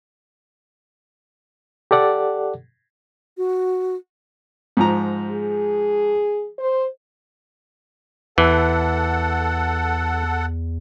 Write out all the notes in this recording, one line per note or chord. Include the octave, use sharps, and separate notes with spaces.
G4 A4 D5 F#5
F#4
G#2 F3 A#5
G#4
C5
E2 E3 A4 F#5